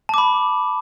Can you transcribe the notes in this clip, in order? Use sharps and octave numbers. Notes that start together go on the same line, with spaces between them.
A5 B5 D6